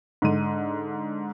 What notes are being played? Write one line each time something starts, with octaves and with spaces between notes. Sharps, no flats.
G#2 D3 D#7